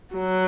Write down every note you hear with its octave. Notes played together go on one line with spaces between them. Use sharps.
F#3